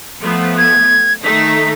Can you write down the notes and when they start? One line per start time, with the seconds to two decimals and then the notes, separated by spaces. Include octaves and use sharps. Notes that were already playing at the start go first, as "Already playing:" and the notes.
0.21 F3 A3 B3
0.58 G#6
1.24 D#3 A3 D#4 B6